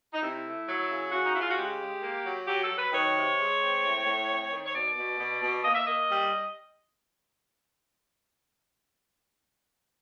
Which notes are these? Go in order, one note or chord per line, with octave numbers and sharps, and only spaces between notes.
D#4
C3 E4
A3
F#3
C#3
C#3 F#4
D#4
C#3 E4
F4
F#4
G#3 G4
G#3
A#3
F#3
F#3 G4
A4
F#3
B4
D#3 C#5
C3
G#3
C4
A2
A2
C4
D#3
C#5
B2 D5
B2
B2
B2
A#3 D#5
E5
A#3 D#5
G3